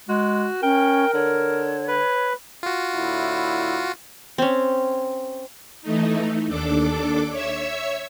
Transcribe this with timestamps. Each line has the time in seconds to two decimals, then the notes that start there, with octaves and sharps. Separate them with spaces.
0.09 G#3 F#4
0.63 C#4 A#4 G5
1.14 D3 C#5
1.88 B4
2.63 F4 F#4
2.95 A2 D3 E4
4.38 C4 C#4
5.82 E3 A3 D#4
6.47 D#2 D4 A4 D6
7.31 C#5 E5 E6